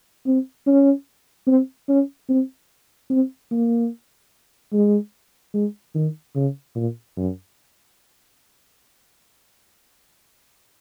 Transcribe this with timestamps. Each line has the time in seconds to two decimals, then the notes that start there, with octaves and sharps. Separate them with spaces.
0.26 C4
0.66 C#4
1.47 C4
1.88 C#4
2.29 C4
3.10 C4
3.51 A#3
4.73 G#3
5.54 G#3
5.95 D#3
6.35 C#3
6.75 A#2
7.17 F#2